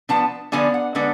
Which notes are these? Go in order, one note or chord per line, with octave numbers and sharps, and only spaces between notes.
F3 B3 D4 A5
D3 F3 B3 D4 G#5
F#5
D3 G#3 B3 D4